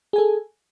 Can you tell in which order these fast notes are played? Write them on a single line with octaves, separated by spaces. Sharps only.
G#4 G#5 A4